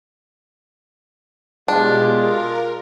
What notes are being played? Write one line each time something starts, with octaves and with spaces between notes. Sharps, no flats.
B2 G#3 D4 F4 G4
A#4